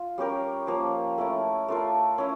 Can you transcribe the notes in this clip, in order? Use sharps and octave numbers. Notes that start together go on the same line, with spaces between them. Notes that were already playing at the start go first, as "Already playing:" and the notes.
Already playing: F4
G3 C#4 G4 A#4
F3 A#3 C#4
A3 C#4 E4 A#4
A3 D4 F4 A#4
C#4 E4